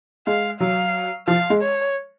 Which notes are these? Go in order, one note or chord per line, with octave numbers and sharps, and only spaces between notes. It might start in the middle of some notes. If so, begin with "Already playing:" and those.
G#3 F5
F#3 F5
F3 F5
G#3
C#5